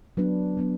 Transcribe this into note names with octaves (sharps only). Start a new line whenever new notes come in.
F#3 B3 D4 B4
F#3 B3 D4